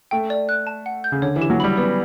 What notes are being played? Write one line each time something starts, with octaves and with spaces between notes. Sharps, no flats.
A3 G5
D5
F#6
A5
F#5
G6
C#3
D3 C#5
E3
G4
F#3
G3 B5
B3 D5